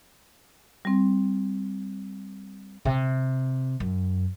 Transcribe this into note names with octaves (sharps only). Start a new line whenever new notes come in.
G3 C4
C3
F#2